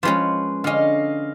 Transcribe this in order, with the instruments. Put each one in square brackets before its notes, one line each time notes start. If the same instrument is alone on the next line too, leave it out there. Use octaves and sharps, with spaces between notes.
[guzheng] F3 G#3 C#4 [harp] B4 C6
[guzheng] D3 C#4 [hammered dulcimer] D#5 F5